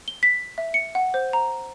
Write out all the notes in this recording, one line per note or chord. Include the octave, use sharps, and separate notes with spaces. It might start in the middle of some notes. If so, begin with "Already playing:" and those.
G7
B6
E5
C#7
F#5
C5
A#5